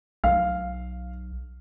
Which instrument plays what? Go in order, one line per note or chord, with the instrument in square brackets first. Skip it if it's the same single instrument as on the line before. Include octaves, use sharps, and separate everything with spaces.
[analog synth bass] B1 [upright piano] F5